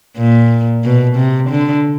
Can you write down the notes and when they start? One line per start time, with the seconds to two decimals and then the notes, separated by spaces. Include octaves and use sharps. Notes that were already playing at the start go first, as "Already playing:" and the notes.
0.18 A#2
0.84 B2
1.16 C3
1.50 D3